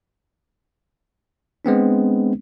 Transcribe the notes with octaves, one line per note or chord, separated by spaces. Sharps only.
G#3 B3 C4 D4